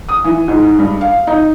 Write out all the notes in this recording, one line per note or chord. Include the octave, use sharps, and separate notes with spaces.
D#6
E3
G#2
G2
F5
D#4